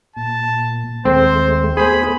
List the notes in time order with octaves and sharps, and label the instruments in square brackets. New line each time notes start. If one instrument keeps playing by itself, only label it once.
[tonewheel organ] A#2 [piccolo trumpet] A5
[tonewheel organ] D#2 G#3 A3 [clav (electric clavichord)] C4 [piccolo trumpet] C5
[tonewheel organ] A3 B3 [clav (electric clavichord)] G#4 C5 [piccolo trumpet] B5